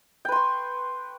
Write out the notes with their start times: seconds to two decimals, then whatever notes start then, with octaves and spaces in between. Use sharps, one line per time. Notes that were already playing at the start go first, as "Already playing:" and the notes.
0.25 G5
0.29 B4
0.32 C6
0.36 C#6